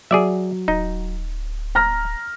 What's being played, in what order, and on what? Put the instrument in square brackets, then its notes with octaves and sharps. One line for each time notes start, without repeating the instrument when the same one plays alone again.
[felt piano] F#3 [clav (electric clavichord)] G#4 D5 E5
[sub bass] D1 [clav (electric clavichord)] D#4
[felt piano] A#5 F6 A#6